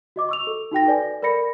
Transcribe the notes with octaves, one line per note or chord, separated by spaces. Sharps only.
F#4 D#5 D6
C#6 E6 F7
A4
D#4 F#4 G5 A#6
A4 B4 D5 G#5
A#4 D5 B5 A#6 C#7